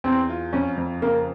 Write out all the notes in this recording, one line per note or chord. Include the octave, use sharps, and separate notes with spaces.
E2 C4
F4
F2 C#4
F2
C#3 A#3